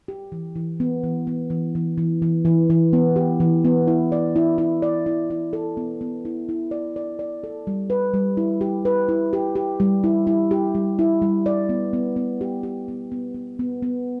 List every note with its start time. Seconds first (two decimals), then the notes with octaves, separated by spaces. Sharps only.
0.08 G4
0.32 E3
0.56 E3
0.80 B3
1.03 E3
1.27 B3
1.50 E3
1.75 E3
1.98 E3
2.22 E3
2.45 E3
2.70 E3
2.93 B3
3.16 G4
3.40 E3
3.65 B3
3.87 E4
4.12 D5
4.36 E4
4.58 E4
4.82 D5
5.06 E4
5.30 E4
5.53 A4
5.77 B3
6.01 B3
6.25 E4
6.49 E4
6.71 D5
6.96 D5
7.19 D5
7.44 A4
7.67 G3
7.90 B4
8.14 G3
8.37 E4
8.61 G4
8.85 B4
9.09 E4
9.33 G4
9.56 G4
9.80 G3
10.04 E4
10.27 E4
10.51 G4
10.75 G3
10.99 E4
11.22 G3
11.46 D5
11.69 B3
11.93 B3
12.16 B3
12.41 G4
12.63 G4
12.88 B3
13.12 B3
13.34 B3
13.59 B3
13.82 B3